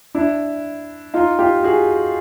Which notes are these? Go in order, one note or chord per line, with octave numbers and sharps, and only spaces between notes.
D4 E4
D#4 F4
F4 G4
F#4 G#4